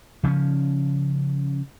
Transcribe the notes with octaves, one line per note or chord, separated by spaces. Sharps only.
C#3 F3 C4 C#4